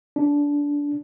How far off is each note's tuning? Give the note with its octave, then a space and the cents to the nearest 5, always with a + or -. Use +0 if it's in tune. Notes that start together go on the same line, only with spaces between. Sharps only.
D4 -20